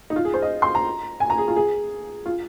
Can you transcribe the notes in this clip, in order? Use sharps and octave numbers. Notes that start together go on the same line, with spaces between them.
D#4
F4
G#4
C5
D#5
C6
A#5
G#5
A#5
G#4
F4
G#4
F4